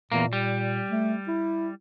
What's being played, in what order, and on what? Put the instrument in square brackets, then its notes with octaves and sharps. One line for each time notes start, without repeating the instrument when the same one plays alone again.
[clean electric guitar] E2 G2 A#3 [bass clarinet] A#2
[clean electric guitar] G3
[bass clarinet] A3
E4